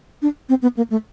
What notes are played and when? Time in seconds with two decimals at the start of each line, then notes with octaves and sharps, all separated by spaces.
0.22 D4
0.49 C4
0.62 B3
0.77 A#3
0.90 A3